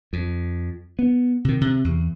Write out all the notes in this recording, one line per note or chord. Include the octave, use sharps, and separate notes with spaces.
F2
B3
C3 D#3
C3
E2